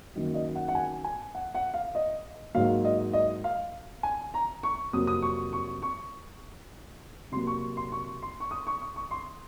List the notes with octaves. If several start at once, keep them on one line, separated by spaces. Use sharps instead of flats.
F#2 D#3 F#3 A#3
D#5
F#5
F#5
G#5
G#5
F#5
F#5
F5
D#5
G#2 F#3 A#3 F5
D#5
D#5
F5
G#5
A#5
C#6
F2 C3 F#3 A#3 D#6
D#6
C#6
C#6
C#6
C3 F#3 A#3 C6
C#6
C6
C#6
C6
C#6
D#6
C#6
D#6
C#6
C6